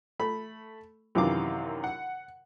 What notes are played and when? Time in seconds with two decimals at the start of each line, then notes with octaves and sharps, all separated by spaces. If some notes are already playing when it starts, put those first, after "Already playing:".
0.19 A3 B5
1.15 F#2 C3 D#3 E3 F5 D6
1.84 F#5